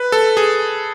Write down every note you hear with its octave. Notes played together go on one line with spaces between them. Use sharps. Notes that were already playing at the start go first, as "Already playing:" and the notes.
Already playing: B4
A4
G#4